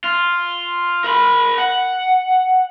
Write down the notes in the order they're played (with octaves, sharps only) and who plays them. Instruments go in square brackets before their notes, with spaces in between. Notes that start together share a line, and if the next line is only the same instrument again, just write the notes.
[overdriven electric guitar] F4
A#4 B5
F#5